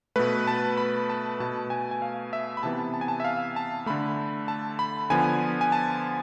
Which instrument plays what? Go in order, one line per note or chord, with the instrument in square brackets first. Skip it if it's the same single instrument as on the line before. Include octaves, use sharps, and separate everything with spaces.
[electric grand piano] B2 A3 B4
A5
B5
A5
B2 A3 A5
G#5
G#5
F5
E5
B5
C3 E3 B3 A5
A5
G#5
A5
E5
F5
A5
D3 A3 B5
A5
B5
D3 F3 B3 G#5
G#5
A5